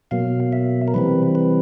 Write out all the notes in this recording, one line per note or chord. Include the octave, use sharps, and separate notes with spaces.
B2 F#3 A#3 F5
E5
A#4
C3 E3 G3 C4 B4
B4